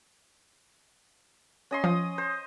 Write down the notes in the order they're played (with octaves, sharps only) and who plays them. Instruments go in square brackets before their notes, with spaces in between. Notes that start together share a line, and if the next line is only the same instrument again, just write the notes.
[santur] C#4 D#5 C6
[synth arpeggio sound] F3 [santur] D#6
[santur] C5